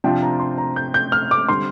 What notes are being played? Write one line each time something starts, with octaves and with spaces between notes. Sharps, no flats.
C3 F3 D4 F4 G5
A#5
C6
A#5
G6
G6
F6
D6
D3 G3 C4 C6